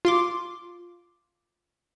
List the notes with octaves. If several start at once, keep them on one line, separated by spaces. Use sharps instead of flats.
F4 C6 D6